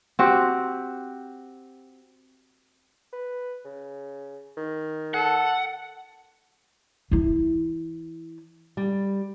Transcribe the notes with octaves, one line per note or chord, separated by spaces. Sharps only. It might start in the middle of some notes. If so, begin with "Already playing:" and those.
C4 F#4 G4
B4
C#3
D#3
A4 F#5
E3 E4
G3